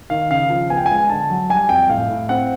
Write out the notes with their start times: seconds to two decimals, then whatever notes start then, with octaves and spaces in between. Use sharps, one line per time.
0.10 D#3 F5
0.31 C#3 F5
0.50 F3
0.70 B3 G#5
0.77 G5
0.86 G#3 G#5
1.10 D3 A5
1.30 F#3
1.50 G3 G#5
1.69 F2 G5
1.89 A2 F5
2.10 A2
2.29 C4 F#5